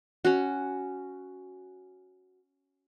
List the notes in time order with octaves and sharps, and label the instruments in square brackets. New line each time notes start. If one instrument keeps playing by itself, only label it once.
[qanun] C#4 F#4